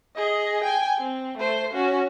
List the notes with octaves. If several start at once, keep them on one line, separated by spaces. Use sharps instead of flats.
G#4 D#5
G5 G#5
C4
A3 C5
C#4 F#4